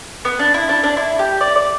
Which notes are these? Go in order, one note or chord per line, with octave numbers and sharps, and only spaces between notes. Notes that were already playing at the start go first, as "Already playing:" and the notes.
B3
D4
E4
D4
D4
E4
G4
D5
D5